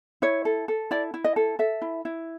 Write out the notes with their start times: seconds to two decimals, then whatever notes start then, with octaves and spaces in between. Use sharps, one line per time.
0.22 E4 C#5
0.45 A4
0.68 A4
0.91 E4 D5
1.14 E4
1.24 D#5
1.36 A4
1.59 A4 E5
1.82 E4
2.05 E4